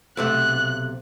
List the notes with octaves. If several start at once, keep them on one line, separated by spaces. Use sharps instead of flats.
B1 C3 A3 F#6